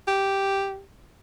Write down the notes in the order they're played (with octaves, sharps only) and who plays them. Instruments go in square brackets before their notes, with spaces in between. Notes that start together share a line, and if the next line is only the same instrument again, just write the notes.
[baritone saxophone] G4